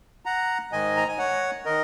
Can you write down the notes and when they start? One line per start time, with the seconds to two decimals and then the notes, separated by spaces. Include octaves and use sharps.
0.25 F#5 A#5
0.72 G#2 D#3 D#5 G#5
0.97 A#5
1.08 G#5
1.18 C#5 F#5
1.65 D#3 A#4 D#5